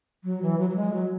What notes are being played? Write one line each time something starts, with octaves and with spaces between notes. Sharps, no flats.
F#3
E3
F#3
F#3
G#3
F#3